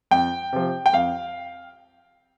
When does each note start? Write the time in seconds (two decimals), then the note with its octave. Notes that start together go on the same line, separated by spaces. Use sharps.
0.11 F2 G5
0.53 C3 F3
0.86 G5
0.93 F2 F5